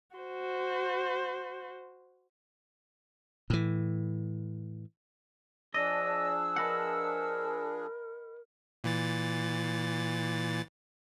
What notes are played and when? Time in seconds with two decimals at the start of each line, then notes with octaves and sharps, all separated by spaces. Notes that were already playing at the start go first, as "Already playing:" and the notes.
0.16 F#4 C5
3.50 A2 E3
5.74 F3 D4 G#4 D5 D#5 E6
6.56 A#4 B4 D#5 F#5
8.84 A#2 E3 A6